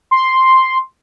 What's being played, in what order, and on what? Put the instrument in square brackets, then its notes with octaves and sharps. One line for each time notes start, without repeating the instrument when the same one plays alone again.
[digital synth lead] C6